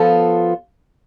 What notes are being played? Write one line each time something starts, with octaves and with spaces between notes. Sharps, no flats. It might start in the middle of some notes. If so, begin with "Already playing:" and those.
Already playing: F3 B3 F4 A4